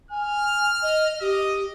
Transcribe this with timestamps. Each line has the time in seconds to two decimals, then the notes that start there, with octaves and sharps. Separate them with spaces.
0.11 G#5 F6
0.83 D#5
1.21 G4 D#5